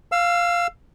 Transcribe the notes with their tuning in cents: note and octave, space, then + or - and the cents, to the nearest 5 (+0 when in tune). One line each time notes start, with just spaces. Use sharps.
F5 +0 E6 +30